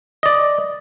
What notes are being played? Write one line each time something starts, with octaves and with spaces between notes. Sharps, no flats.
D5 D#5